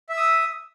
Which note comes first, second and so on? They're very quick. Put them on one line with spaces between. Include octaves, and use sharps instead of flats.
E5 E6 D#6